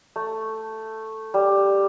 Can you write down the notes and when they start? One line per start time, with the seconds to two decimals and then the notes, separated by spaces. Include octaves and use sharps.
0.16 A3
1.34 G3